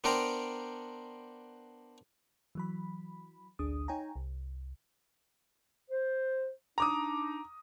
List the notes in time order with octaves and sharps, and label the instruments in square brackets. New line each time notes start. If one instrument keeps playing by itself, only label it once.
[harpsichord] B3 D4 A#4 C5 G5 A#5
[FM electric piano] E3 F#3 B5
A1 D2 D4 G#4 D#6
D#4 C#5 G5 G#5 A#5
C2
[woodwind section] C5
[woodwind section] D4 D#4 [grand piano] A#5 D6 D#6